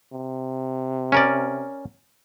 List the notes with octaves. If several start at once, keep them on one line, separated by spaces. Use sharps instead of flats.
C3
C#4 A#4 D5